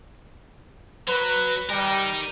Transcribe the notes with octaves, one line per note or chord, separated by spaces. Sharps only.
F#3 B4
G3 D#4 A#4